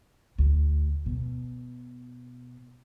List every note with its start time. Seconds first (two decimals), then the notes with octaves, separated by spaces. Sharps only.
0.38 D2
1.06 B2